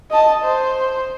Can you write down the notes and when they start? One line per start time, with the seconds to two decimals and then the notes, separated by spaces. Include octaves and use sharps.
0.11 D#5 A5
0.44 C5